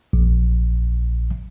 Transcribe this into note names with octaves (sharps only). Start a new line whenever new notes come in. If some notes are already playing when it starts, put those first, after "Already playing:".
A#1